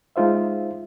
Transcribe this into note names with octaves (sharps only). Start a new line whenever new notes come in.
G#3 D#4 F4 C5 E5